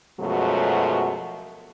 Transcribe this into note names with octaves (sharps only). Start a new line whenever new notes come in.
F#2 B2 F3 F#3 G#3 A3